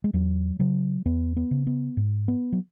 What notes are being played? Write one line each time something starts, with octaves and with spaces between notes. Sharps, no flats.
G#3
E2 F#3
C#3 F#3
E2 B3
B3
C#3
B3
G#2
B3
F#3